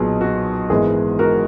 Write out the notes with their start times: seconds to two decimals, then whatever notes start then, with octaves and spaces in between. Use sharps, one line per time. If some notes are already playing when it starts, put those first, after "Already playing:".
Already playing: B1 A#2 F#3 B3 G#4
0.21 F#4
0.70 G#1 G#2 E3 G#3 B3 G#4
1.19 F#4 A#4